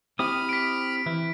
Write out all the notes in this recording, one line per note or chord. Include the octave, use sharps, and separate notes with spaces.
C4 E4 G4 B5 D#6 F6
B6 D7
E3 E4